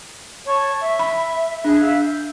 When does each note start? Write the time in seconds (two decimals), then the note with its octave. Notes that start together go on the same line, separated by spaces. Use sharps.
0.46 C#5 A5 C#6
0.81 E5
0.99 B5
1.65 D4 G#4 E5 F#6
1.80 E5 F5
2.01 G6